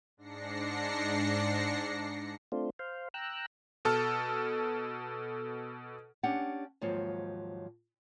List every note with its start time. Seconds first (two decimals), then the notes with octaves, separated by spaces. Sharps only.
0.17 G#2 D4 A#6 C7 C#7
2.52 A3 C4 D4 F4
2.79 C5 F5
3.14 G5 A#5 E6 F#6
3.85 B2 A4 A5 F6
6.23 C#4 D4 G4 F#5
6.81 D#2 G#2 F3 F#3 C#5